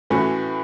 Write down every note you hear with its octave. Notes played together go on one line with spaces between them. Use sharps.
A2 E3 A3 C#4 F#4